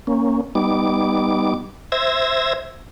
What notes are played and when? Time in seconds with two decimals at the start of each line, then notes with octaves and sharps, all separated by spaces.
0.07 A#3 C#4
0.55 G3 B3 D#4 D6
1.92 C5 E5 E6 G#6 A#6